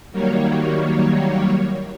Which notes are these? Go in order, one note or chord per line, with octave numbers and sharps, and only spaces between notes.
D#3 F#3 G3 A#3 C#5